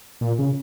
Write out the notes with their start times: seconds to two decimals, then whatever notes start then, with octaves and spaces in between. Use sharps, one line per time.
0.21 A#2
0.39 C#3